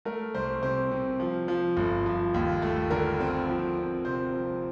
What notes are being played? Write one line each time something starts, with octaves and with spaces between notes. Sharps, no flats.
A3 A#4
C2 C5
C3 C5
C3
F3
F3
G1
F3
D#2
A3
D3 A#4
C4
F3
C4
C3 C5
F3